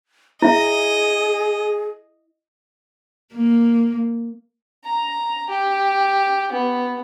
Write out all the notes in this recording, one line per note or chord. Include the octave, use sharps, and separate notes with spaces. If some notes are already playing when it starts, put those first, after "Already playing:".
E4 G#4 D#5 E5
A#3
A#5
G4
B3